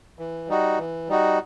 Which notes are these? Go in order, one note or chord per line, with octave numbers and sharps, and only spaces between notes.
E3
G3 D#4 F#4
E3
G3 D#4 F#4